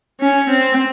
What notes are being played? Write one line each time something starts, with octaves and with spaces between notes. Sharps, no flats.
C#4
C4